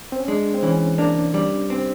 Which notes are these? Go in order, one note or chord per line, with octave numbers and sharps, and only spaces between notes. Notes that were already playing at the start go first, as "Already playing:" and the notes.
C4
C#4
G#3 D4
C4
E3 C#4
A#3 D4
G3
C4